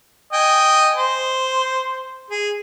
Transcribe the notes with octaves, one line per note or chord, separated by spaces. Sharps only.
D#5 G5 G#5
C5
G#4